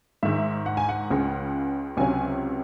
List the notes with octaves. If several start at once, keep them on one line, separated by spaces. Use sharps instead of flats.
G#2 D#3 G#3 E5
F#5
G#5
F#5
C#2 C#3 G#3
C#2 C3 F#3 C#4 G#5